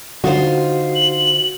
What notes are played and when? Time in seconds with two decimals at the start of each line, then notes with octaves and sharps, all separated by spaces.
0.24 D3 D#4 F4 F#4 C5
0.95 F#7